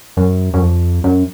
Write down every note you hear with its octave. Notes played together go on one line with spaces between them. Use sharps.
F#2
F#2
F2
F#2